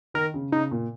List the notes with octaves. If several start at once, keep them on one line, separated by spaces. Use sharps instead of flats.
D#3 A#4
C#3
C#3 D#4
A#2